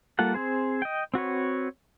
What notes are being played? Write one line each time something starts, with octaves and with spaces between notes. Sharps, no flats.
G3 A#3 F4 A4 F#5
C4 G#4 C5
D#5 G5
C4 F#4 B4 C#5